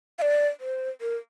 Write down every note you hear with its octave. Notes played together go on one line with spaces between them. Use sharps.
F5
D5
C5
A#4